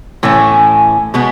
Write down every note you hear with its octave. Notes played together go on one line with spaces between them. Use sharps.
A2 E3 A3 C#4
B2 G#3 B3